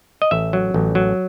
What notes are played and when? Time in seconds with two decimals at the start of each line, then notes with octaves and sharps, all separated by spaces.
0.22 D#5
0.31 A1 E5
0.53 F#3
0.74 A1
0.95 F#3